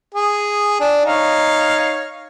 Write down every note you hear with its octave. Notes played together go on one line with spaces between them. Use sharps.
G#4
D4
D#4 C#5 F5